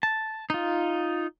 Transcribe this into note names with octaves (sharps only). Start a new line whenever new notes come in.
A5
D#4 F4